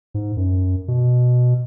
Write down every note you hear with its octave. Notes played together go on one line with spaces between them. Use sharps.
G#2
F#2
B2